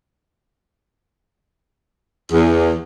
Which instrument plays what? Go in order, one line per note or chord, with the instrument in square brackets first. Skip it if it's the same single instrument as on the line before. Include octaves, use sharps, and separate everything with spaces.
[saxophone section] E2